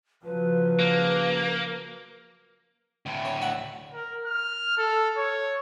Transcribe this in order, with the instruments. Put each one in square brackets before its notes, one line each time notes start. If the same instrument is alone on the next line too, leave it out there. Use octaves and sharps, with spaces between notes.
[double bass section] C#3 F3 F#3 [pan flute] B4
[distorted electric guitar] A#3
D2 A2
[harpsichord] C#5
E5 F#5
[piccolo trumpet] A#4
F6
A4
C#5